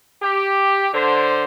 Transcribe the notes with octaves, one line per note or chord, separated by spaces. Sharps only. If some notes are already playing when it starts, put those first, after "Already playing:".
G4
D3 C5